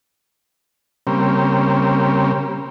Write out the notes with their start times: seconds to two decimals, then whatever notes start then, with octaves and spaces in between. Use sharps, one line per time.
1.07 C#3 G3 A#3 C4